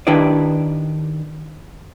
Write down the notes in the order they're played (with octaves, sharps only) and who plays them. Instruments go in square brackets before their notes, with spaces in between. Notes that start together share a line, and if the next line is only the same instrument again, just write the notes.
[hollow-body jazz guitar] D#3 D4 E4 G4 B4 D5